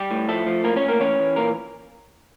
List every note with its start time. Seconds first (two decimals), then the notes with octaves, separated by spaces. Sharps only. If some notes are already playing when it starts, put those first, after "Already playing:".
Already playing: G3 G4
0.11 A2
0.29 F3 A3 A4
0.46 F3
0.64 A2 A#3 A#4
0.76 C#4 C#5
0.82 A2
0.88 A#3 A#4
1.00 E3 C#4 C#5
1.19 E3
1.36 A#2 A#3 A#4